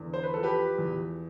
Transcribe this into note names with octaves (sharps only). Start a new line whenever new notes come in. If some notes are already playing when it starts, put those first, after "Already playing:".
Already playing: E2 D3
C5
B4
F3 A4
G4 B4
E2